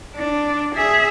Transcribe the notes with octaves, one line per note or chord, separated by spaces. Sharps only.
D4
G#4 E5